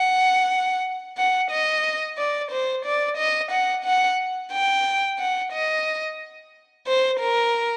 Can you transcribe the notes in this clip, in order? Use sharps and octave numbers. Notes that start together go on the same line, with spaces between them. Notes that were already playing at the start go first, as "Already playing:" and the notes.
Already playing: F#5
F#5
D#5
D5
C5
D5
D#5
F#5
F#5
G5
F#5
D#5
C5
A#4